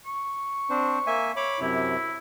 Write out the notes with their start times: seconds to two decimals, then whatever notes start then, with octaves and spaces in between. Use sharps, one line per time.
0.06 C#6
0.70 C4 D4 C5
1.07 A#3 E5 G#5
1.36 C#5 B5 D6
1.60 F#2 C3 E4